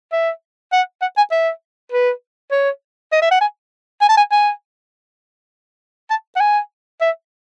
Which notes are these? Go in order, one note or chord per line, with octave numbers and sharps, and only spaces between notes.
E5
F#5
F#5
G#5
E5
B4
C#5
D#5
E5
F#5
G#5
G#5
A5
G#5
G#5
A5
F#5
G#5
E5